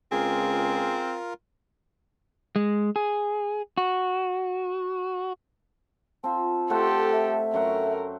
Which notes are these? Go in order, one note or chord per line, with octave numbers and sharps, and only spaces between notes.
C#2 C4 F4 G#4 A#4
G#3
G#4
F#4
C4 F4 A5
A3 G4 A4 C5 F#5
E5
F#2 A3 A#4 F#5